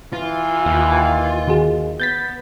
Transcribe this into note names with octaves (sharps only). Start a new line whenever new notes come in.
E3 F4
D#2
D#3 F#4 G#4
B3 G6 A6 B6